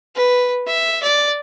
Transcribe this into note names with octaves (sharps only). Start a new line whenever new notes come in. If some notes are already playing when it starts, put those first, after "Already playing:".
B4
E5
D5